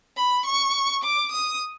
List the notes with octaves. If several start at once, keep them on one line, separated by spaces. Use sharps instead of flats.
B5
C#6
D6
D#6